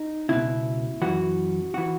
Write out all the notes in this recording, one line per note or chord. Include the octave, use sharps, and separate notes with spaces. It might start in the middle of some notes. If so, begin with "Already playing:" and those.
Already playing: D#4
C#2 B2 E4
F#2 E3 F#4
E3 F#4